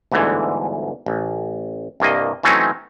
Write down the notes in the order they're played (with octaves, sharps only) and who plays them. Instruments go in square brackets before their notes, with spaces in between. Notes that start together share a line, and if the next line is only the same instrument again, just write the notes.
[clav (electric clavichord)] G1 D2 G#2 D3 E3
A1
C2 G2 A#3 D#5
E3 F#3 A3 C4 C#4 D#4